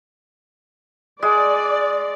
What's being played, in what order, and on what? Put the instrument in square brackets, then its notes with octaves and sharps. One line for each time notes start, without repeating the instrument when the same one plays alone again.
[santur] G#3 [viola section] D5